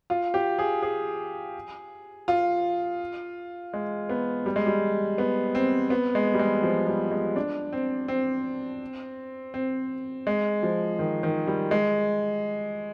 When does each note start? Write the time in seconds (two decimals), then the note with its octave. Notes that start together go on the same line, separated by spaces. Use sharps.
0.10 F4
0.34 G4
0.59 G#4
0.82 G#4
2.28 F4
3.74 G#3
4.09 B3
4.46 G3
4.56 G#3
4.67 G3
5.18 B3
5.55 C4
5.90 B3
6.15 G#3
6.34 G3
6.39 G#3
6.63 F3
6.87 G3
7.11 G#3
7.36 D4
7.73 C4
8.08 C4
9.54 C4
10.27 G#3
10.63 F3
10.99 D#3
11.23 D#3
11.47 G3
11.71 G#3